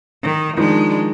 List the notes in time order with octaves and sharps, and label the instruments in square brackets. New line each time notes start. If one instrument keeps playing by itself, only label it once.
[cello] D#3
[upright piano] D#3 F3 [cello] G#3 D4